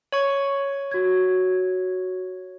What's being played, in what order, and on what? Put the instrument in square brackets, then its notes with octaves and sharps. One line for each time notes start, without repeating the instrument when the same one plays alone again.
[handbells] C#5 C#6
[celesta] F#4 G#6